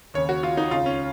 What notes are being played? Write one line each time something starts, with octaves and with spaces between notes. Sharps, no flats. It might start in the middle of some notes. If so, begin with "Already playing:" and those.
D#2 C#3 C#5
F#4
F4
D#4
C#2 C#3 F4
C#4